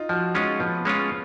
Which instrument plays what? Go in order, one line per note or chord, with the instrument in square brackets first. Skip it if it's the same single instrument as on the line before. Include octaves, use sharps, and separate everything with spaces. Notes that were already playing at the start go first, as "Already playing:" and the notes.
Already playing: [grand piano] D#4 F4
[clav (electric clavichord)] F3 [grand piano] F#4
[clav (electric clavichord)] G#3 C#4 F4 [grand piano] D#4
[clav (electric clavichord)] F3 [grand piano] B3
[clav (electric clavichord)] G#3 C#4 F4